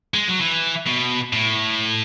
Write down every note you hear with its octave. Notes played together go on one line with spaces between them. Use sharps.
G#3
F#3
E3
B2
A2